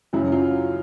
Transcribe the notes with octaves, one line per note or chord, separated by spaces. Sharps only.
F#2 C#3 F#3 E4
F4